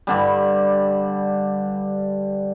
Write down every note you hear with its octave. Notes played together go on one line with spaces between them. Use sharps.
G2 D3 G3